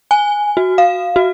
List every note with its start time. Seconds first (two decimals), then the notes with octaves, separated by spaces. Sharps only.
0.11 G#5
0.57 F#4
0.78 F5
1.16 F#4